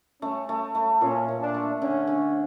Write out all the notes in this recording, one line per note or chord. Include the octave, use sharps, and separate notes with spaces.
A3 C#4
A3
A3
A#2 C#4
A#2
D4
A3
D3 C#4
D3